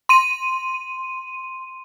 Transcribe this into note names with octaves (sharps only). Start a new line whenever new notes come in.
C6 D#7